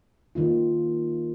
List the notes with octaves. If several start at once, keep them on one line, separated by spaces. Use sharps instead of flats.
D#3 A#3 F4